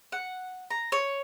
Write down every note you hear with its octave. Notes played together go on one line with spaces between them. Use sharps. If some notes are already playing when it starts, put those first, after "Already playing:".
F#5
A#5
C#5